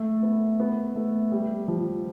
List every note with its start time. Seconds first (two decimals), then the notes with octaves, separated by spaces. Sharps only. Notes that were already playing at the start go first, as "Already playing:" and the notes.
Already playing: A3
0.23 B3
0.60 B3
0.95 A3
1.32 G3
1.68 F3